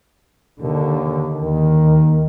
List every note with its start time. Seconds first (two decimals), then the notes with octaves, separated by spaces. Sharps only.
0.61 D#2 D3
1.42 D#2 D#3